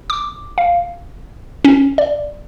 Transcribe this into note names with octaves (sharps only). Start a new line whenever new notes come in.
D6
F5
C#4
D5